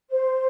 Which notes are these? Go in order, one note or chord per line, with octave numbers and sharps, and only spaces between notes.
C5